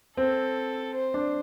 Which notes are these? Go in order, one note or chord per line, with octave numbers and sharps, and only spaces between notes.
C4 A4
C5
D4